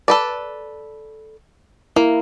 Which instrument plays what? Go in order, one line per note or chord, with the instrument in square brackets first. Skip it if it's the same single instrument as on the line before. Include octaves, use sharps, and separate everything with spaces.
[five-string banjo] A4 B4 D5
[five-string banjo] A#3 [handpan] E4